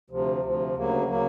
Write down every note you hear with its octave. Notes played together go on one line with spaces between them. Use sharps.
D2 C3 F3
D2 C3 F3
D2 C#3 F#3 A#3
C#3 F#3 A#3